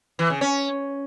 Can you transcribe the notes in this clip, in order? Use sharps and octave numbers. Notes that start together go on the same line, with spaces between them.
E3
C#3
C#4